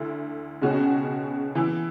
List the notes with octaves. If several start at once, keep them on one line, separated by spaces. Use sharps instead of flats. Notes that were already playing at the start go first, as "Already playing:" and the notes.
Already playing: D2 D3 E4
C#2 B2 G#3 C#4 F#4
E3 B3 E4